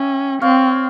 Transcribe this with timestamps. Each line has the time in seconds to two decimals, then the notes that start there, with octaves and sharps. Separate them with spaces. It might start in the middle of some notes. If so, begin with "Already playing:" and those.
Already playing: C#4 E5 G5
0.42 C4 C#5 F5